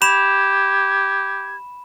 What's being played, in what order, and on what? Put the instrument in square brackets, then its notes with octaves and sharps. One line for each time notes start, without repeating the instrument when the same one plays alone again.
[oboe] G4 [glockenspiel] B5 E7 [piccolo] G#6